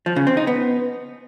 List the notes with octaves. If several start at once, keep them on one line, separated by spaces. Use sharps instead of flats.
F3
C#3
C4
D#4
B3